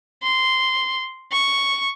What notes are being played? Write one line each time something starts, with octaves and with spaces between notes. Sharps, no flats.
C6
C#6